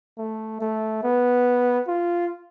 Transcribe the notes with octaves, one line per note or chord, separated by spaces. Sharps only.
A3
A3
B3
F4